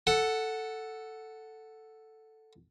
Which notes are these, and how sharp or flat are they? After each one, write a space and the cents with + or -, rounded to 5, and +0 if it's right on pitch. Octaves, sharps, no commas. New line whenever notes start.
A4 +0 F#5 +0